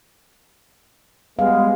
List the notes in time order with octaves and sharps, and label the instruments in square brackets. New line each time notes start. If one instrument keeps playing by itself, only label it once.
[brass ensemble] G3 G#3 B3 [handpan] F5